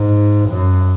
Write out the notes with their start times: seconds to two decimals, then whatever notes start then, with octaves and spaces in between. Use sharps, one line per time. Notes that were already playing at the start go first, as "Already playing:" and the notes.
Already playing: G#2
0.50 F#2